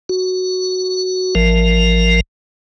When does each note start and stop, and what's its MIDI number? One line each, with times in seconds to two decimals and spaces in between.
0.09 1.35 66
1.35 2.20 33
1.35 2.20 53
1.35 2.20 70